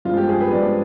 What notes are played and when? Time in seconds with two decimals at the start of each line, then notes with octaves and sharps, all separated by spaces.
0.05 G2 F3 G#3 F4
0.17 G4
0.29 G#4
0.40 B4
0.52 G2 F3 G#3 D5